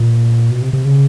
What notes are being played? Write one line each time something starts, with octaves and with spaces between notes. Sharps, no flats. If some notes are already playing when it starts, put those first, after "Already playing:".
Already playing: A#2
B2
C3
C3
C#3